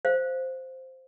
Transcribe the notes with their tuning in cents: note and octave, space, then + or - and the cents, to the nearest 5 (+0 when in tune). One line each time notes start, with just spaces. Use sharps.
C5 +0 F5 +0